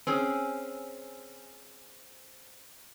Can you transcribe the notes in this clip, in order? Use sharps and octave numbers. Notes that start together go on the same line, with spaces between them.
C4 C#4 G#4